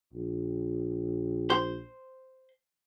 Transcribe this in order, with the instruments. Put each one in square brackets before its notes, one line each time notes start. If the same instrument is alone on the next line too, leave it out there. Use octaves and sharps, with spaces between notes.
[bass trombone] A#1
[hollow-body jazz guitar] C5